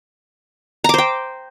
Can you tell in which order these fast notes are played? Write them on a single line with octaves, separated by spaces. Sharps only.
A#5 D6 C5 G5